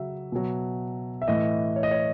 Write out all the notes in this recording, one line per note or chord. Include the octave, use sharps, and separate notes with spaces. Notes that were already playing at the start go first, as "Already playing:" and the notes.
Already playing: C#3 F#3 E5
B2 F#3
E5
A2 E3 D#5
C#5
D#5
C#5